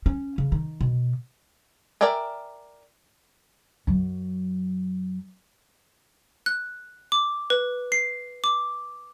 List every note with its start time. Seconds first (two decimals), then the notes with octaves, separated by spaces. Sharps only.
0.06 C#4
0.38 C#3
0.52 D#3
0.81 B2
2.01 A#4 D5 E5 G5 G#5
3.87 F#2 F#3
6.46 F#6
7.12 D6
7.50 B4
7.92 C7
8.44 D6